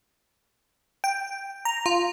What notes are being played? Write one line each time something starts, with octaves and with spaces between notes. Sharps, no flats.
G5
A#5
F4